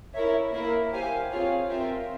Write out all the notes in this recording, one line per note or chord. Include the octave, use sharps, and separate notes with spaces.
E4 A#4 C#5 E5
A#3 E4 A#4 E5
G4 C5 F5 G#5
C4 F4 G#4 C#5 F5
C4 F4 A#4 E5 G5